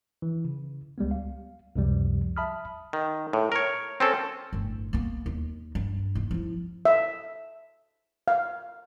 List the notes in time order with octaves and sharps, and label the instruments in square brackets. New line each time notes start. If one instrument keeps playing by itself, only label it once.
[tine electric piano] E3
C#3
C#2 G3 G#3 B3
F5
C#2 F#2 C3 F3 G3
E5 A5 B5 D#6 F6
[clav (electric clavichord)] D#3
A2
A#4 C#5
C4 C#4 A4
[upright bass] G1 A2
A#3 B3
D#2
G2
D#2
F3 E4
[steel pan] E5
F5